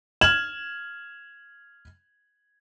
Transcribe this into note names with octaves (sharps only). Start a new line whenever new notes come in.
F6 G#6 E7 F#7